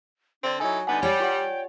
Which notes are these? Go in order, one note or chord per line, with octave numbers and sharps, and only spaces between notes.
D3 C4 D4
F#3 D#4 E4 A4 G#5
D3 G3 B3 D#4 F#5 G#5 A#5
G3 C#5 D5 G5
F4 G4 F#5